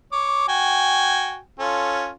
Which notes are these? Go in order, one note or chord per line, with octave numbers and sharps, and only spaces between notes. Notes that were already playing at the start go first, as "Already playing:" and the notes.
C#5 D6
F#4 G5 G#5
C#4 F4 A4